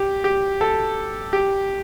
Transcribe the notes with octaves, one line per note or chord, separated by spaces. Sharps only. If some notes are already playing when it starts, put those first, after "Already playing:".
Already playing: G4
G4
A4
G4